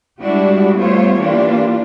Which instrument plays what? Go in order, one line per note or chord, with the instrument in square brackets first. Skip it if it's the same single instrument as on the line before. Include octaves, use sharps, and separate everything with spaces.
[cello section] G3 G#3 D4 E4 F#4 G4
G3 A3 B3 F4 C5 C#5
E3 A#3 D4 F4 G4